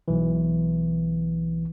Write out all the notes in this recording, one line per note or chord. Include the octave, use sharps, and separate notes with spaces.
B1 E3